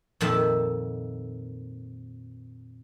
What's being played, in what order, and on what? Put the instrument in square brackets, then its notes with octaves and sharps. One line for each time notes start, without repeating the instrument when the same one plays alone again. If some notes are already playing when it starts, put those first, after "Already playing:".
[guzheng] F2 A#2 D#3 F3 A4 E5